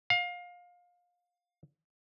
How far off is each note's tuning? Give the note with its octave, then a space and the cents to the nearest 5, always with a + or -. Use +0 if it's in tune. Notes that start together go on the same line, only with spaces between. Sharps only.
F5 +25